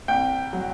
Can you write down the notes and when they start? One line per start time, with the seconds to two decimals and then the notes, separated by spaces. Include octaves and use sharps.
0.08 C2 G5
0.53 F#3